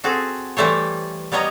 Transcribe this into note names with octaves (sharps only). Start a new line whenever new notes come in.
C4 F#4 G#4 A4
E3 G3 A3 C5 C#5
G3 B3 C#5 D#5 A#5